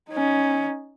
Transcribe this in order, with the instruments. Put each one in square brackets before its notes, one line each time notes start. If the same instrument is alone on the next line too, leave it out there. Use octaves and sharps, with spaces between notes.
[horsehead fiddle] C#4 D#4